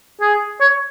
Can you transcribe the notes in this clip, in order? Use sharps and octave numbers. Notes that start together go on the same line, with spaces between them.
G#4
C#5